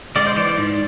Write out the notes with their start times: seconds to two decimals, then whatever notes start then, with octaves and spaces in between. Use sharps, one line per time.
0.16 G#3 D5
0.27 C5
0.37 E3 D5
0.57 G#2